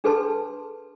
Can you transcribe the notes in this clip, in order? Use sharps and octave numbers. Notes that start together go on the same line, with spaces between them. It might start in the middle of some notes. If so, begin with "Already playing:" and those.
D4 G#4 A4 B4 A5 C6